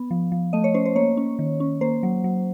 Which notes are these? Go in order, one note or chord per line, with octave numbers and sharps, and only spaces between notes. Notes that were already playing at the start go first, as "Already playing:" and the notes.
Already playing: B3
F3
F3
A3 D#5
C#5
C#4 C5
C5
A#3 C#5
C#4
D#3
C#4
A#3 C5
F#3
F#3